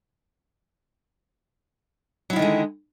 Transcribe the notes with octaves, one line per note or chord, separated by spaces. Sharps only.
D3 D#3 F#3 G#3 E4